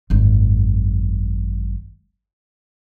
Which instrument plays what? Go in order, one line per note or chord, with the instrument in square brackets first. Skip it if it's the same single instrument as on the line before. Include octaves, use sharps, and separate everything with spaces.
[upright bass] G#1 F#2